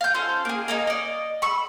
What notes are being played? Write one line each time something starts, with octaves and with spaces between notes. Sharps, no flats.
F5 G6
C#4 F4 A4 C5
A#3 G#4
A#3 C#4 D#4
D5 D#5
B5 C#6 E6